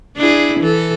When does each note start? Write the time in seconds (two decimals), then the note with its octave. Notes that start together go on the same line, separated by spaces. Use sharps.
0.17 D4 E4 G#4
0.59 E3 A4